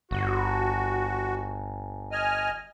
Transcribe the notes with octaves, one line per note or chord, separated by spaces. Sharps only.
G1 F#4
D#5 G#5 F6